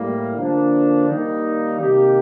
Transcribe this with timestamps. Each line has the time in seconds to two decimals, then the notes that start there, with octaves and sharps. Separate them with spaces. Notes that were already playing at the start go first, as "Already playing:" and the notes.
Already playing: A2 G3 A#3
0.37 D3 F3 A#3 D4
1.09 D#3 G3 A#3 D#4
1.80 C3 D#3 A#3 D#4 G4